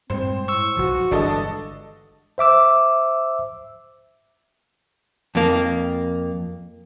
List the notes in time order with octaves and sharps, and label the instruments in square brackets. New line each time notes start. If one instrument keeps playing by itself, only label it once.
[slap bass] G2 A#2 G#3 [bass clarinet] C4 [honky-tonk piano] C5
[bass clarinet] A2 [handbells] C#6 E6
[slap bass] B1 F3 [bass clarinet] F#4
[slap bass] G1 E3 G#3 [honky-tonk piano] D4 A4 D#5
[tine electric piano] C5 E5 D6 E6
[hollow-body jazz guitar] F2 A#3